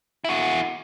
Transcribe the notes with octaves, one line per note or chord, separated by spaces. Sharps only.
E4 F#4